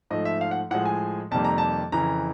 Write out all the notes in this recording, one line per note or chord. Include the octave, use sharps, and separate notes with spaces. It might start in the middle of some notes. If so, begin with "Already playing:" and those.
G#2 F3 A3 D#5
E5
F5
F#5
A2 F3 G#3 F#5
G#5
F2 C3 D#3 G3 A#3 A5
A#5
A5
F2 C#3 E3 A#5